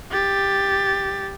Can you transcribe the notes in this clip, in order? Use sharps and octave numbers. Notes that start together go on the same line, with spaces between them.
G4 A6